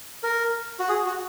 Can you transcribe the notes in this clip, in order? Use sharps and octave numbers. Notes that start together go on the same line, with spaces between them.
A#4
F#4
G#4
F#4